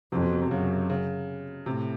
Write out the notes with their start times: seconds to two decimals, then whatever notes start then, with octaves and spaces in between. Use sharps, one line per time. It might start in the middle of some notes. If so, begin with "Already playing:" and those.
0.12 F2 C3
0.22 B2
0.32 B2
0.42 C3
0.51 F#2 C#3
0.90 C#3
1.66 A2 C3